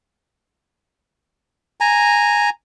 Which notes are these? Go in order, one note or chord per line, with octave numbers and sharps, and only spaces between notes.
G#5 A#5